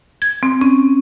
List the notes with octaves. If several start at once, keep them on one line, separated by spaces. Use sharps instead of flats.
G#6
C4
C#4